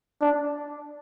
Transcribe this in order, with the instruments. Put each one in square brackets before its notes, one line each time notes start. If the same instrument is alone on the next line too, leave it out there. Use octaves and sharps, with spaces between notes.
[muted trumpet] D4